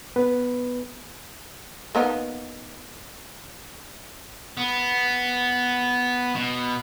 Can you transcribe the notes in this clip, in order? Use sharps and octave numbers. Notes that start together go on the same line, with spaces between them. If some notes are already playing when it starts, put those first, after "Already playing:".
B3 B4
A#3 B3 D#4
B3
B2